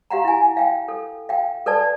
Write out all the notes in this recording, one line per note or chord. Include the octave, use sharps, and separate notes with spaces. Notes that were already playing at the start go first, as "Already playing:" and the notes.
G4 F5 F#5 A#5
E4 G#5
F5 G5
A4
F5 G5
A4 B4 D5 A5